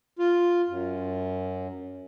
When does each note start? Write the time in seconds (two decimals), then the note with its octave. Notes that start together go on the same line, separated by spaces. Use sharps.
0.19 F4
0.68 F#2